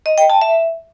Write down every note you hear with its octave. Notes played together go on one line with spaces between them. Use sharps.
D#5
G5
A5
E5